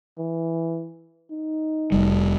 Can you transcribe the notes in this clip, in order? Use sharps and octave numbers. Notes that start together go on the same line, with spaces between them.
E3
D#4
F1 G3